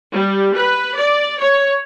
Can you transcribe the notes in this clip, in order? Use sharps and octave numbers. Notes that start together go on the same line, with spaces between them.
G3
B4
D5
C#5